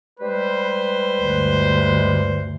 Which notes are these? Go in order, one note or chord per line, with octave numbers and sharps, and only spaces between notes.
G3 G#3 B4 C5
D2 G2